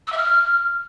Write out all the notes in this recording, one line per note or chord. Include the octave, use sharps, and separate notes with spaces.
E6
E5
F6